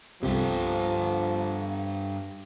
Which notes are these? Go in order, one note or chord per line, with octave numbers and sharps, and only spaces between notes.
C2 G2 C3 F3 G4 A4